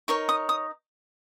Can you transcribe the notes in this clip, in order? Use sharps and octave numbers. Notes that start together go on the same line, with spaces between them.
D#4 A#4 C#5 C#6
D#6
D#6